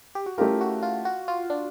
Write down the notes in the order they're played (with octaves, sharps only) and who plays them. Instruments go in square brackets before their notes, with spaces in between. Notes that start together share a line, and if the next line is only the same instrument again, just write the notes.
[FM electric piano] G4
F#4
[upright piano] A3 C#4 E4 G4 A#4 [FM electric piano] F4
[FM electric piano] F#4
F4
F#4
F4
D4